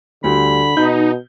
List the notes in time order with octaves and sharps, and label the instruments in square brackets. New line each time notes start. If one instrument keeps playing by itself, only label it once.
[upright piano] D2 G3 [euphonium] D3 [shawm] B5
[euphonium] B2 [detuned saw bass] D#4 [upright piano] G6